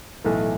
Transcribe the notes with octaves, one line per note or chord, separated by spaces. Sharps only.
B1 A2 E3 A3